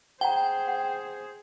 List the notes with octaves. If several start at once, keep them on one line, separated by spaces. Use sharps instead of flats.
G#4 C5 D5 F#5 G5 A#5
F#5